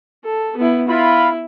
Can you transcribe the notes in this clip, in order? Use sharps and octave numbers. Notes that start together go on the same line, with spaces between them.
A4
B3 E4
E4 F4 B5